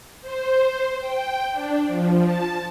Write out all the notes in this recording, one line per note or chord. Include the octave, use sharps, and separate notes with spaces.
C5
G5
D4
F3
A5